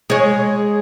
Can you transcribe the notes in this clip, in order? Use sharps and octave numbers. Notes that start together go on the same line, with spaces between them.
G#3 C#5